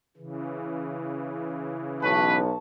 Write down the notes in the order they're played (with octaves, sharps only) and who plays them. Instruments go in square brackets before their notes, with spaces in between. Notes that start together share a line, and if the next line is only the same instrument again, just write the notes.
[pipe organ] C#3 E3
[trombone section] B1 [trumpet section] B4 [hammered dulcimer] A5 C#6